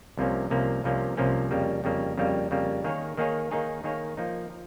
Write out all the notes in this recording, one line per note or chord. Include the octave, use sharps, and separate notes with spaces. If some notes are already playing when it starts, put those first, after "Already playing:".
C2 C3 F3 A#3 C#4
C2 C3 F3 A#3 C#4
C2 C3 F3 A#3 C#4
C2 C3 F3 A#3 C#4
F2 C#3 G3 A#3
F2 C#3 G3 A#3
F2 C#3 G3 A#3
F2 C#3 G3 A#3
D#3 A#3 D#4 G#4 C#5
D#3 A#3 D#4 G#4 C#5
D#3 A#3 D#4 G#4 C#5
D#3 A#3 D#4 G#4 C#5
F3 A#3 D#4
F3